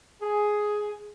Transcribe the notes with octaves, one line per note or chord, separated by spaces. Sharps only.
G#4